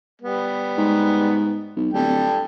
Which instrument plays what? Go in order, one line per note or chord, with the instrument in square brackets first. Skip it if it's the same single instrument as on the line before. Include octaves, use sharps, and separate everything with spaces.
[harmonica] G3 B3
[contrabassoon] G#2
B1
[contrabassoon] D1 [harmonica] G3 A4 G5